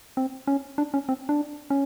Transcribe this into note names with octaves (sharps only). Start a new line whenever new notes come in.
C4
C#4
D4
C#4
C4
D4
C#4